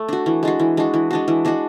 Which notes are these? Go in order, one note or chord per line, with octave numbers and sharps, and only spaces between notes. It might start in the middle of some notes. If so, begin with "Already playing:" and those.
Already playing: A3
D4 F#4
E3
G#3 D4 F#4
E3
G#3 D4 F#4
E3
G#3 D4 F#4
E3
G#3 D4 F#4